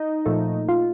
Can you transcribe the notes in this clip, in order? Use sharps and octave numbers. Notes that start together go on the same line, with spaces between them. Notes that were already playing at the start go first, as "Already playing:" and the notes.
Already playing: D#4
A#2 F3 A3
F4